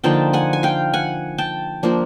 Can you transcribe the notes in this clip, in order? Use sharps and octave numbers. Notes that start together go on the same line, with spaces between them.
D3 F3 A#3 D#4 G5 A5
F#5 G#5
G#5
F5 G5
F#5 G#5
G5 A5
F3 A#3 D4